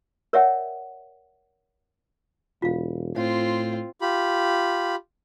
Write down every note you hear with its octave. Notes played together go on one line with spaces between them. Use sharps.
A#4 C#5 D5 E5 F#5 G5
E1 F4 F5
A2 C4 F4 C#5
F4 G4 B5